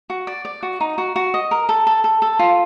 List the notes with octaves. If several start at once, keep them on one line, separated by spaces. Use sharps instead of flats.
F#4
D5
D5
F#4
D#4
F#4
F#4
D#5
A#4
A4
A4
A4
A4
F4